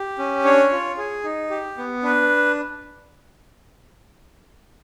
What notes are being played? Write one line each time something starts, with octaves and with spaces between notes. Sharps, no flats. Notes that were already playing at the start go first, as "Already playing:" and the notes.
Already playing: G4
C#4
D4 C#5
F4
G#4
D#4
G4
B3
D4 B4